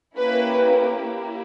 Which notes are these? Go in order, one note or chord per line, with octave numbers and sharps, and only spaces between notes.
A#3 C#4 E4 G4 B4
A#3 E4 G4